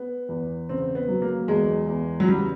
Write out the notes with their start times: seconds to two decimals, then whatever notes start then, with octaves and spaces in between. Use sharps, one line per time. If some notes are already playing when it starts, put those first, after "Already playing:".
Already playing: B3
0.29 E2
0.69 C#3 C4
0.95 B3
1.08 F#3
1.22 A#3
1.48 E2 G#3
1.88 E2
2.20 F#3
2.28 C#3 G3